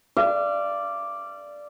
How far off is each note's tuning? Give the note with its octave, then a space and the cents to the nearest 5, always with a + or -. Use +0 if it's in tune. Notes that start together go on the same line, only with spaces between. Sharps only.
D5 +0 F5 -35